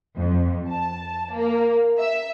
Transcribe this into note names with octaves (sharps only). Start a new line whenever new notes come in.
F2
A5
A#3
E5